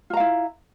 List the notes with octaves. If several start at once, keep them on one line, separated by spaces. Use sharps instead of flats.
E4 F4 F5 A#5